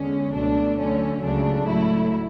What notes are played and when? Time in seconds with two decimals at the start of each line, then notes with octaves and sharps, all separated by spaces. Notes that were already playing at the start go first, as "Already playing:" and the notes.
Already playing: E2 D3 G#3 C#4
0.33 C#2 B2 F#3 A3 D4
0.77 D2 D3 F#3 A3 C#4
1.22 C#2 C#3 F#3 A3 D4
1.66 A2 F#3 A3 E4